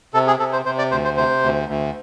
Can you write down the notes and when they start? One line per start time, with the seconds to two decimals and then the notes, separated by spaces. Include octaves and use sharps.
0.14 C3 A4
0.27 G#4
0.39 C3 A4
0.53 C5
0.65 C3 C5
0.78 D5
0.91 D2 C5
1.04 C5
1.17 C3 C5
1.43 D2
1.69 D2